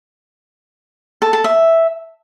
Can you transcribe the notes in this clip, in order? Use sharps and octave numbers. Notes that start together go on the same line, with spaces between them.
A4
A4
E5